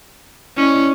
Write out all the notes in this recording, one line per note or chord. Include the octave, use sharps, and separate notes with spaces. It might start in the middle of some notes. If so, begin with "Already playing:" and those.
C#4 E4 D5 D#5